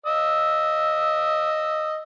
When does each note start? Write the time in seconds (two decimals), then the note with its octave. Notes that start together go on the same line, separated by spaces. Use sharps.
0.06 D#5 E6